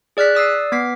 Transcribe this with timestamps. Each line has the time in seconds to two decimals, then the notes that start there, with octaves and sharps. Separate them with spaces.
0.17 G#4 D5 F6 F#6 B6
0.35 D5 D#6 E6 C7
0.72 B3 D6 B6 C7